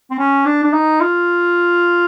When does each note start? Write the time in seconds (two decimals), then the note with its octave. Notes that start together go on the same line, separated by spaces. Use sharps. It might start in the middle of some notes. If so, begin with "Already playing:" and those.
0.11 C4
0.18 C#4
0.46 D4
0.64 D4
0.73 D#4
1.01 F4